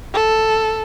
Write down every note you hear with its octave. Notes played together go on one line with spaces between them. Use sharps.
A4